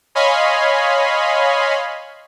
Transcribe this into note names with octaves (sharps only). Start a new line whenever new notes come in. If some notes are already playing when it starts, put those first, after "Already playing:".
C#5 D#5 F5 G#5 B5 C6